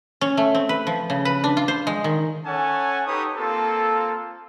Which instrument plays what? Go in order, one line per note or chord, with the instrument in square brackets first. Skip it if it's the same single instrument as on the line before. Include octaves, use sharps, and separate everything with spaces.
[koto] C#4
A3
C4
B4
F3
C#3
B4
D4
F4
C5
G#3
D#3
[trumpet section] C#4 A4 C#5 F#5 G#5 A5
D#4 G4 A4 B4 C#5 D#6
A#3 C4 F4 A4